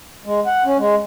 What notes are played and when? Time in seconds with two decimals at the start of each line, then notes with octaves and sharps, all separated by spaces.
0.25 G#3
0.46 F#5
0.65 C#4
0.78 G#3